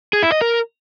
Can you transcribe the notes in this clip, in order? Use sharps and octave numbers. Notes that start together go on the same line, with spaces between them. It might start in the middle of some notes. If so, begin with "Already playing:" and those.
G#4
E4
D#5
A#4